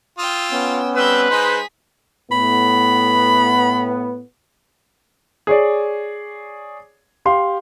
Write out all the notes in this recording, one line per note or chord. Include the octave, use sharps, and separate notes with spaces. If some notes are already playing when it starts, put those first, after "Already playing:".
F4 G5 D#6 E6
B3 C#4
G3 C4 B4 E6 G6
G#3 D#4 G#4 C5 B6
A2 B3 B5
G#4 C#5 D5
G4 F5 C6